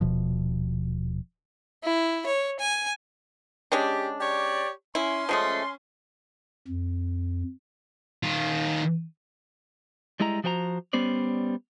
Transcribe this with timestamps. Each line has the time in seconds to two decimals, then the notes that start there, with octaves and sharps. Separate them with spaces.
0.01 D#1 B2 F3
1.84 E4
2.26 C#5
2.60 G#5
3.72 G#3 C#4 D4 G4
4.19 G4 C#5 D5
4.95 C#4 E4 C6
5.29 F3 G#3 A3
6.67 F2
8.23 D#3 F4
10.20 G3 G#3 E4 D#5 A#5
10.44 F3 F#4 C5 G5 A#5
10.93 G3 B3 C#4 C5 D5